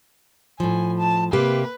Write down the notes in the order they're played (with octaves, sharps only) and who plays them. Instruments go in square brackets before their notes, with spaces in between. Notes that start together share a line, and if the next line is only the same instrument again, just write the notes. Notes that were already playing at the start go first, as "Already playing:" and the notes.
[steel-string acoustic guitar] A2 F3 [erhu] G#5
[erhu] A5
[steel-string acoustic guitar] C3 A#3 G4 [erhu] B4